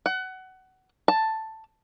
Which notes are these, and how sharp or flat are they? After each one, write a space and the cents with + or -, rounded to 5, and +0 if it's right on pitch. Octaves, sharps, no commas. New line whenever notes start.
F#5 +20
A5 +5